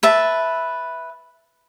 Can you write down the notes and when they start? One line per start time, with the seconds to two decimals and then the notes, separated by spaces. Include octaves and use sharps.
0.03 B4 E5 A5